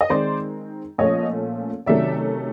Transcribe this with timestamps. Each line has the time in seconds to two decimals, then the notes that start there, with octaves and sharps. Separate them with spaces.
0.01 D#5
0.10 D#3 G#3 C4 C5 D5
0.98 A#2 F3 A3 C#4 C#5 D#5
1.86 C3 D#3 F#3 A3 C#4 D5 E5